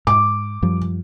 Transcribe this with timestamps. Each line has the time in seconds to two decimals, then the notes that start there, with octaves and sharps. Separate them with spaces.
0.07 G#2 D6
0.62 F#2 F3 G3